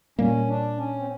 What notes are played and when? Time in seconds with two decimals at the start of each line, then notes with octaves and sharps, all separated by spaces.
0.19 A#2 G3 A#3 C#4
0.48 D4
0.77 C#4
0.98 C4